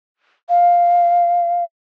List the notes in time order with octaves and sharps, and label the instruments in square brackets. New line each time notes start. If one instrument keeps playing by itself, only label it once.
[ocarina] F5